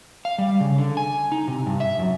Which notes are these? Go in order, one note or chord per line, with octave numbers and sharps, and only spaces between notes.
F5
G3
C#3
D3
G#5
D#4
C3
G2
E5
F#2